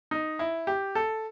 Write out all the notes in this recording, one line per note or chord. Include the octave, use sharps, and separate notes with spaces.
D#4
E4
G4
A4